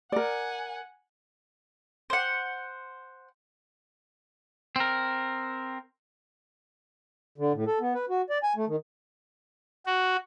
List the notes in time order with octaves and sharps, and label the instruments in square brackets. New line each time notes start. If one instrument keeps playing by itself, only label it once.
[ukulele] A#4 D5 [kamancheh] F#5 G#5
[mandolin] C5 F#5
[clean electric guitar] C4 A#4
[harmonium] D3
A2
A4
B3
B4
F#4
D5
G#5
A3
D#3
[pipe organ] F#4